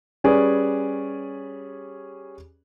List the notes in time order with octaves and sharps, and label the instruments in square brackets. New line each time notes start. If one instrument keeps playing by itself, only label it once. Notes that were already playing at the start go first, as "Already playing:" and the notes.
[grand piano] G3 C#4 G#4 B4 D5